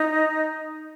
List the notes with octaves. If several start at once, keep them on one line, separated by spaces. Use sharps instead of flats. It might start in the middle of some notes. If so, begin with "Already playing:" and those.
Already playing: D#4